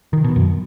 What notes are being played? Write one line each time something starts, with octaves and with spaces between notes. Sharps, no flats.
D#3
B2
F#2